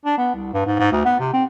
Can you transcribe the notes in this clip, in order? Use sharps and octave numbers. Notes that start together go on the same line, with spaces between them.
D4
B3
C2
G2
G#2
G#2
D2
B3
C3
C4